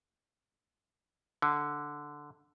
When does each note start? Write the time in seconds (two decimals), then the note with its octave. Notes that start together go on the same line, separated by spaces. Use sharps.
1.42 D3